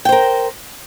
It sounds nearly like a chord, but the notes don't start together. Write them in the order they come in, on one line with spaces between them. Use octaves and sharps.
G5 C5 A#4